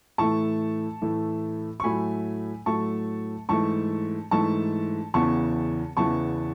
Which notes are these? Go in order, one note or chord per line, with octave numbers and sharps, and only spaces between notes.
A2 E3 A3 A5 C#6
A2 E3 A3
C#6
A2 F#3 A3 G#5 B5
A2 F#3 A3 A5 C#6
G#2 E3 A3 A5 C#6
G#2 E3 A3 A5 C#6
E2 C#3 E3 B3 A5 C#6
E2 C#3 E3 B3 A5 C#6